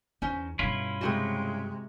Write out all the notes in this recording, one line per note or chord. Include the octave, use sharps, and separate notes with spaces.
E2 C#4 D#4 C5
G2 B2 C#4 E4 F4 A#5
C3 G#3 C4 D#4 F#4